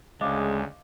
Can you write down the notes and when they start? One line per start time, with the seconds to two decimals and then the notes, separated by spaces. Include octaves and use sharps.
0.21 D2 C#3 G#3 D#5 F5 D6